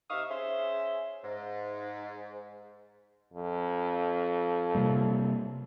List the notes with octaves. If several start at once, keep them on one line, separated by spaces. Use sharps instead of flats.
C3 D#4 E5 F5 C#6 D#6
C#4 G#4 C5 E5
G#2
F2
C3 G3 A#3